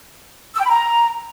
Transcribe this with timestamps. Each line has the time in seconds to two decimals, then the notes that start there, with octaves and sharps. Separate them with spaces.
0.55 E6
0.60 G5
0.65 B5
0.70 A#5